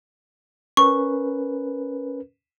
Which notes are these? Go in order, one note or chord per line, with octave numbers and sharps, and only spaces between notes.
C#4 A#4 B4 C#6